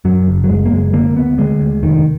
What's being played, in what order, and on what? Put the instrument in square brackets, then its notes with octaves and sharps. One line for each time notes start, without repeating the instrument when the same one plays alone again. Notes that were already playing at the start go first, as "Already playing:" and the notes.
[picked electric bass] F#2 F#3
F#1
F#3
F#1 G#3
A#3
F#1 G#3
D3 A#3
D2 B3
D3 G#3
D2
F1 D#3